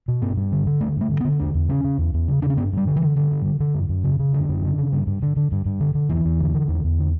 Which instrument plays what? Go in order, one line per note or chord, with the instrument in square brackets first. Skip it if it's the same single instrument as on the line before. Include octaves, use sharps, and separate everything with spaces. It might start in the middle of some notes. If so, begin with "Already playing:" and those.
[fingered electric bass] B2
G2 B3
G2
D3
D3
G2 A3
G2 A3
D3
B3
D3
E2 D4
E2
C#3 C#4
C#3
E2
E2
C#3
C#3 D4
C#4
G2 B3
G2 G3
D3
E3
D3
G2 D3
G2
D3
D3
F#2
F#2
C#3
C#3
F#2 D3
F#2
C#3
C#3
G2
G2
D3
D3
G2
G2
D3
D3
E2 E3
E2
D3
D3
E2
E2
D3